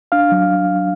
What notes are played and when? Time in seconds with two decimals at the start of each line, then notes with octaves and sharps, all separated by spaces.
0.12 D4 F5 F6
0.32 F#3